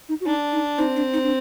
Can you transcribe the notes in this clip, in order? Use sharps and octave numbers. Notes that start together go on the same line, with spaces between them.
D#4
F#4
D4 D#4
D#4
C4 D#4
D4
D#4
D4